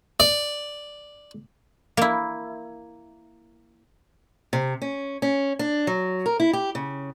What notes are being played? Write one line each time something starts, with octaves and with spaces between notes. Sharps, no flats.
D5
A#3 E4
C3
C#4
C#4
D4
F#3
A#4
E4
G4
C#3